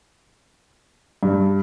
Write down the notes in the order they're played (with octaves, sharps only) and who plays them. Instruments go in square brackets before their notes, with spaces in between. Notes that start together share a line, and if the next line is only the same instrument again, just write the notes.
[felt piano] G2